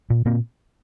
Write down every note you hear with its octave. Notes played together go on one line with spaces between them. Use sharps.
A#2
A#2 A#3 C4